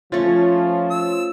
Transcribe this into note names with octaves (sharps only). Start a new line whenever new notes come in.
F3 A3 C#4 F4 C#5 A6
E6